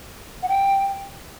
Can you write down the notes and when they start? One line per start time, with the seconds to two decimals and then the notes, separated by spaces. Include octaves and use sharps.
0.43 F#5
0.49 G5